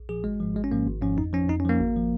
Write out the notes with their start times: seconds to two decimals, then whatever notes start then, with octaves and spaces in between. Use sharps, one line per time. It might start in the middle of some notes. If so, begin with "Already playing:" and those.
Already playing: A#1
0.09 A#2 F3 G#4
0.24 G#1 G#3
0.40 G#2 F3
0.55 G#1 G#3
0.64 C#4
0.71 G#2 F3 A#3
0.86 G#1
1.01 G#2 F3 C#4
1.17 F2 D#4
1.33 F3 C#4
1.48 F2 D#4
1.60 C#4
1.65 F3 A#3
1.80 G#1
1.96 F3